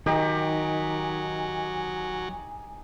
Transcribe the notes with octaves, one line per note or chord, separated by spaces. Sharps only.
D#3 F#3 D#4 G4 G#5 A#5